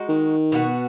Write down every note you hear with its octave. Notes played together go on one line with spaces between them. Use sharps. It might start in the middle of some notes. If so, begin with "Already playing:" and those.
Already playing: G#3 D#4 F#4
D#3
B2 B3 F#4